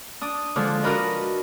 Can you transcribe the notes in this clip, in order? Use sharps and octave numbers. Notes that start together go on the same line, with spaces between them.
D4 D#6
D3 F3 G#3
D4 F#4 A#4 B4 D#5